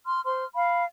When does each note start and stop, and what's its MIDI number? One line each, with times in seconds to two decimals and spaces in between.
0.06 0.22 84
0.06 0.22 89
0.25 0.44 72
0.25 0.44 84
0.25 0.44 89
0.54 0.84 77
0.54 0.84 83